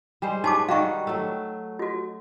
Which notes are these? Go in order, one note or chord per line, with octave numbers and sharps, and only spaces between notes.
G3 G#3 C5
D#4 G#4 B4 C#5 A5 D6
D#3 G3 F#4 F5 C#6
F#3 A3
F4 F#4